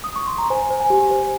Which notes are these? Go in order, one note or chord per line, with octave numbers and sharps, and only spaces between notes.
D#6
C#6
C6
A#5
C5 G#5
C5
G#5
G4
C5